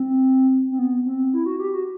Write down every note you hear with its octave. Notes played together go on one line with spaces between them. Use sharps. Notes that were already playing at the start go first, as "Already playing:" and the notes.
Already playing: C4
C4
B3
C4
E4
F#4
G4
F#4